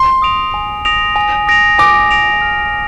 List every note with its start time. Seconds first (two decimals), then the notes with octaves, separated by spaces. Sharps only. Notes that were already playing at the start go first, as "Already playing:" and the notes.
Already playing: C6
0.22 D#6 A#6 D7 F7
0.54 G#5
0.85 D#6 A#6 D7 F7
1.16 G#5
1.47 D#6 A#6 D7 F7
1.78 G#5 D6
2.11 D#6 A#6 D7 F7
2.42 F6